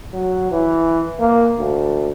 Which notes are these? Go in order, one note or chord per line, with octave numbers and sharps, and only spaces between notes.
F#3
E3
A#3
D2